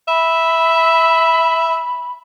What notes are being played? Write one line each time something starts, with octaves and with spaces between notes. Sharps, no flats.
E5 B5